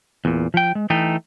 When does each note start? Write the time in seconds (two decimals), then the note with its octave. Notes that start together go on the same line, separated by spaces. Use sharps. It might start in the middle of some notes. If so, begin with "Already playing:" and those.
0.25 E2 A#2
0.54 F3 G5
0.75 G#3
0.90 E3 A3 D#4 G5